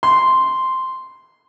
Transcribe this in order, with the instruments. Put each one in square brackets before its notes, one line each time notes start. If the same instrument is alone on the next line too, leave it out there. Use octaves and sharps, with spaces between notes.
[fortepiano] C6